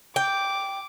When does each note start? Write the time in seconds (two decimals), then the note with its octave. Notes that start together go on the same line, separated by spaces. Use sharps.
0.16 G5 D6